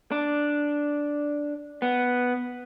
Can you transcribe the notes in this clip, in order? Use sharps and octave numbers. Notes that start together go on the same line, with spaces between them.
D4
B3